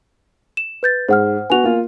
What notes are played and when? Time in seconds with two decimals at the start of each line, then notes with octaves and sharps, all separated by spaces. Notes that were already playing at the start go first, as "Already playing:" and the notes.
0.57 E7
0.83 B4 G6 A6
1.08 G#2 C5 F#5 F6
1.50 B3 F#4 G#5 F7
1.64 A#3 F4